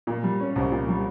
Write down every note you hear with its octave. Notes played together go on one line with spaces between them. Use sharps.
A#2
G3
C#4
C2
A#2
G3